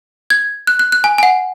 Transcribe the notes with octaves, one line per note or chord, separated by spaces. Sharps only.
G#6
F#6
F#6
F#6
G#5
G#5
F#5